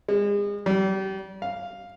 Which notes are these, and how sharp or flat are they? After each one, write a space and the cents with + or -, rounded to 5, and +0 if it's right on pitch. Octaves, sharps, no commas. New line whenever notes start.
G#3 -35
G3 -30
F5 +0